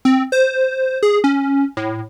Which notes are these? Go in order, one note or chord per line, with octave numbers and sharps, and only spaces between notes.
C4
C5
G#4
C#4
A2